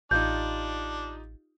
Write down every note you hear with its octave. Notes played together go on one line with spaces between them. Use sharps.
A1 D4 D#4 F4 G4 G6